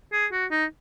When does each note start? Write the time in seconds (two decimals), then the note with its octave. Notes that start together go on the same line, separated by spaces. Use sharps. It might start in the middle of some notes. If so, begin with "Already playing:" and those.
0.13 G#4
0.32 F#4
0.51 D#4